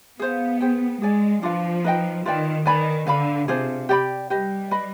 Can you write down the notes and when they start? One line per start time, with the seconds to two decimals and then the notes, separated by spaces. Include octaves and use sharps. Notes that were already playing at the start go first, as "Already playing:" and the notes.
0.19 B3 G#4 C5 F5
0.61 G#4 C5 G5
1.01 G#3 G#4 D5 G#5
1.43 F3 D4 F4 B4 F5
1.84 D#4 B4 D#5 G5
2.25 D#3 F4 B4 D5 G5
2.66 D#3 B4 D5 G#5 B5
3.07 D3 B4 F5 B5
3.48 C3 D4 F4 G#4 C5
3.89 G4 D5 G5 B5
4.30 G3 G4 B4 D#5
4.71 B4 D#5 B5